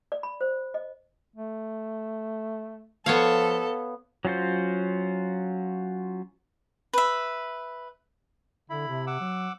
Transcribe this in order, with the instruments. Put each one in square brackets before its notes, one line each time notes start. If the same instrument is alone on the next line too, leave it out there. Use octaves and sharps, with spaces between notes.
[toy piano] D5
B5
C5
D#5
[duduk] A3
[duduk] F3 [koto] B3 C#5 F5 [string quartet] A4
[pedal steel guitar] F#3 C#4 F4 F#4 C5
[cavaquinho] B4 E5
[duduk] D3 [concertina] E4 B5
[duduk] C3
[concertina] F#5 D6 E6
[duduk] F#3